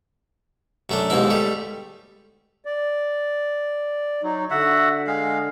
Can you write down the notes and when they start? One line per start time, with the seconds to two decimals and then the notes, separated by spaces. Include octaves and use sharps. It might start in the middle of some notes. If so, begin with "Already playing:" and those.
0.90 F#2 A3 D4
1.10 D#2 G#2 B2 E4
1.30 G3 A3
2.65 D5
4.23 F#3 D#4
4.50 D3 F#4 E5 F#5
5.07 G#3 F5